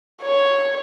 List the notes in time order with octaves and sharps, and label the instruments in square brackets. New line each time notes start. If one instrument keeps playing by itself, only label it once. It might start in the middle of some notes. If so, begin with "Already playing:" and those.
[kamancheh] C#5